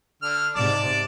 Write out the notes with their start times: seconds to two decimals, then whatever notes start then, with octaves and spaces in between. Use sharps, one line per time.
0.22 D3 F6
0.56 G#2 C3 D5 A5 D6